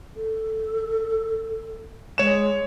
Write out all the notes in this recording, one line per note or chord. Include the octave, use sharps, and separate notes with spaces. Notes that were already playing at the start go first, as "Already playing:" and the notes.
A4
G#3 C#5 E7